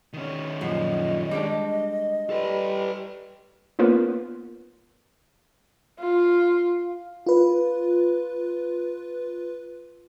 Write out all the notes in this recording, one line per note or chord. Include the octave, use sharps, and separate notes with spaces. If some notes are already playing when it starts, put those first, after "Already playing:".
D#3 C#4
F#2 A#2 F3 D#5
G3 G#3 D4
G3 A4 B4
A#3 B3 C#4 F4 A#4 B4
F4
F4 B4